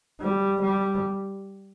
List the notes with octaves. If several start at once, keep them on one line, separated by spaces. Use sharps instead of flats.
G3
G3